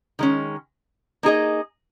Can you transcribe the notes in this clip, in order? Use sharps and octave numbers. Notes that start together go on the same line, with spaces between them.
D#3 G#3 C#4
A#3 D#4 G#4 D#5